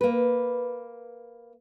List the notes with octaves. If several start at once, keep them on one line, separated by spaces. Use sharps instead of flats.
A#3 B4